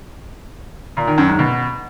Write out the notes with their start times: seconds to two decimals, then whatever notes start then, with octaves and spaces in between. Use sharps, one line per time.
0.97 A#2
1.07 D#3
1.18 F#2
1.28 G#2
1.39 B2